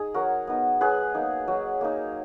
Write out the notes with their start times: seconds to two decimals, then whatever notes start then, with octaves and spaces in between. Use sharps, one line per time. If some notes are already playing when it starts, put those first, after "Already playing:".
Already playing: D#4 G#4
0.14 F#3 F#4 A#4
0.47 B3 D#4
0.81 F#3 G#4 B4
1.14 A#3 D#4
1.48 F#3
1.81 A#3 D#4